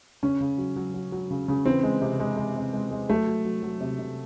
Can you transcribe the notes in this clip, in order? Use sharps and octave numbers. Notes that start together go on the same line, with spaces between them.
C#3 C#4
C#3
F#3
F#3
F#3
F#3
C#3
C#3
E3 C4
G#3
C3
G#3
G#3
C3
G#3
G#3
F#3 A3
F#3
F#3
F#3
C3
C3